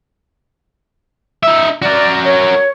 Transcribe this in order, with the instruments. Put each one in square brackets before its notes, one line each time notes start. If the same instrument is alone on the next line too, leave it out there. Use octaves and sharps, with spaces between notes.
[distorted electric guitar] D#4 E5
[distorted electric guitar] F#4 A#4 [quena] D5
[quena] C#5